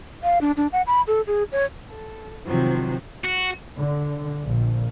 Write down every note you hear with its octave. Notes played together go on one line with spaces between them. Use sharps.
F5
D4
D4
F#5
B5
A4
G#4
C#5
A4
C3 D#3 F3 F#3 C5
F#4
D3
A#1